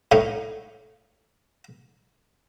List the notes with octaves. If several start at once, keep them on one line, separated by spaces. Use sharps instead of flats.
A2 D#4